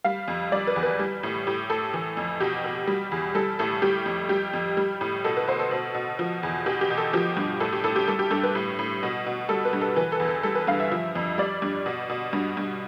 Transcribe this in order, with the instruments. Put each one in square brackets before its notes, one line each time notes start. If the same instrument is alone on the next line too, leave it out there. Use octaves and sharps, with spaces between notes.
[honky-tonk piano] G3 F5
F2
G3 D5
B4
E2
B4
G3
A2
A2 G4
A2 A4
E3
F2
B2 G4
B2
G3
E2
G3 A4
A2 A4
G3 G4
F2
G3 G4
F2
G3
A2
B2 A4
B4
B2 C5
A4
B2
B2
F3
E2
B2 G4
G4
B2
A4
F3 G4
G2
A2 A4
G4
A2 A4
G4
G3 A4
G4
G2 A4
B4
A2
A2
B2
B2
G3 A4
B4
G2
A4
E3 B4
A4
E2
A4
G3 A4
B4
G2 F5
E5
F3
F2
G3 D5
G2
B2
B2
G2
G2